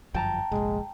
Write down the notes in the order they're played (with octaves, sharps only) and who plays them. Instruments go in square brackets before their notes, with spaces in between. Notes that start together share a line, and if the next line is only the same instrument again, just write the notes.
[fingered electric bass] G1 F#2 F3 [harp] G5 A5 A#5
[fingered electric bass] F1 A#1 [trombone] G#3